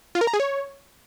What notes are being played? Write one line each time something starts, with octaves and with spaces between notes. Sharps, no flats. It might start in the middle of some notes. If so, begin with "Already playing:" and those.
F4
A#4
A#5
G#4
C#5